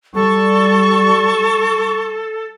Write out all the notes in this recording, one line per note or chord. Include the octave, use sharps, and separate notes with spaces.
G3 A4 C#6